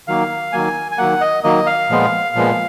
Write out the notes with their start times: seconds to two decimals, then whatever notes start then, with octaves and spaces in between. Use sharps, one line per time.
0.08 D#3 F#3 A#3 F5
0.53 D#3 F#3 A#3 G#5
0.92 G#5
0.98 D#3 F#3 A#3 F#5
1.21 D#5
1.43 D#3 F#3 A#3 D#5
1.66 F5
1.90 A#2 F3 G#3 B3
2.36 A#2 F3 G#3 B3